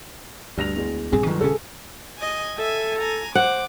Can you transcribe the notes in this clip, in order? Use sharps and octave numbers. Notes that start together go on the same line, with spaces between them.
D2 G2 A#6 F7
E2 G#3
A#1 G2 C4 G#4
G1 D#3 F#3
D#1 C#3 C#4 G#4 A4
D#5 G#5
A4 E5 G#5
G#5 A#5
C5 F#5 D6